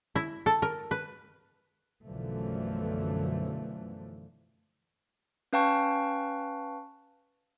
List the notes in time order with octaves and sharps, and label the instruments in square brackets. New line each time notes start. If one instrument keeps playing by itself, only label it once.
[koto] E4
A4
A#4
B4
[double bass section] B1 F#2 D3 E3 F3 A3
[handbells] C#4 B4 F5 G5 A5 C#6